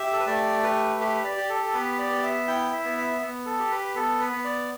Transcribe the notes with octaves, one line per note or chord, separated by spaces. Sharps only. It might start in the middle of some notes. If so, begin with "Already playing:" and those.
Already playing: G4 E5
A4
B4
A3 D5
G4 B4
G4 B4
D5
G4
A4
A4
B3 B4
D5
B3
E5
E4 G5
E5
B3
E5
B3
A4
G4
B4
B3 A4
B4
B3
D5